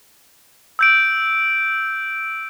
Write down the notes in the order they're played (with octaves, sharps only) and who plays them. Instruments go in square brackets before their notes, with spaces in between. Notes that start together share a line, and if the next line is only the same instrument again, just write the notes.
[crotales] E6 G6 D7